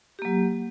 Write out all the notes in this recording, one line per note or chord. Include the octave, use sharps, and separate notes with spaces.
F#3 A#3 G4